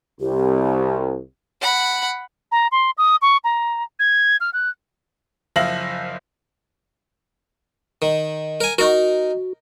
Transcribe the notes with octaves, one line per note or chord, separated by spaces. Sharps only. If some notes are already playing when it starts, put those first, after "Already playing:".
C2 G4
F#5 B5
A#5
C6
D#6
C#6
A#5
G#6
F6
F#6
F#1 F3 E5 F5 A#6 F#7
D#3
A#4 G#5
D#4 F#4 A#4